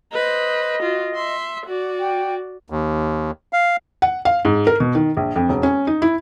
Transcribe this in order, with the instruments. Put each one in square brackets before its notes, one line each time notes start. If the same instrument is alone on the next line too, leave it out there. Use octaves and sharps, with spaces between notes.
[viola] B4 C5 [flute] D#5
[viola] F4 F#4
E5 C6
F#4 D5
[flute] G5
[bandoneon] D#2
F5
[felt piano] F#5
F5
G#2
A#4
B2
D#3
A#1
F2
E1
C#4
D#4
E4